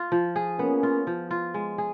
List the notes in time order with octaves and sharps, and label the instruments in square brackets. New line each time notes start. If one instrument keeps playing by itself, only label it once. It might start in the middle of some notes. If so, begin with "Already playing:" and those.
Already playing: [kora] F4
F3
G#4
[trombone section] A#3 C#4 [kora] B3
[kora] F4
F3
F4
G#3
G#4